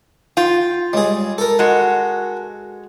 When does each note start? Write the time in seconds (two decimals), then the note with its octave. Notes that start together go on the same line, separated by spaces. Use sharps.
0.37 F4 G5
0.93 G3 G#3 G#4 C#5 D#5
1.38 A4 A#4
1.59 G#3 F#4 D#5